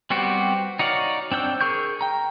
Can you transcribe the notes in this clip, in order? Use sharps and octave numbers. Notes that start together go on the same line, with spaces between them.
G3 B3 C4 F#4 G4
D#4 F#4 C#5 D5 F5
C4 D4 G5 E6
G#4 A#4 C#6 G6
G5 A#5